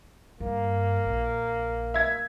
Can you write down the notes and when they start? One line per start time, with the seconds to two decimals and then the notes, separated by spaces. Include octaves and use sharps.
0.40 G2 A#3
1.05 A#1
1.94 E5 G#6